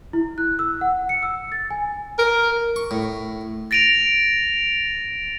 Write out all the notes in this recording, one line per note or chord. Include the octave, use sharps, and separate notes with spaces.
E4
F#6
E6
F#5
C#7
E6
A6
G#5
A#4
C#6
A2
A6 A#6 D7 D#7 F7